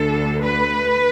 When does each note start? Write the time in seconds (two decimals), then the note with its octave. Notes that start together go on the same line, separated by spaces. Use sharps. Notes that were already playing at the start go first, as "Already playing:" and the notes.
Already playing: D2 D3 A4
0.41 B4